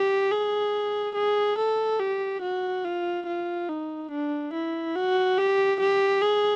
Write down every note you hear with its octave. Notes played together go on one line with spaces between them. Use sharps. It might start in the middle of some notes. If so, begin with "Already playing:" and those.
Already playing: G4
G#4
G#4
A4
G4
F#4
F4
F4
D#4
D4
E4
F#4
G4
G4
G#4